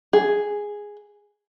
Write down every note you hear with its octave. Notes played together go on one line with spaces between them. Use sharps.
G#4